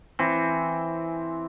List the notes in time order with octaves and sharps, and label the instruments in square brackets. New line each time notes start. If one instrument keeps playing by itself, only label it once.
[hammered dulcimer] E3 C4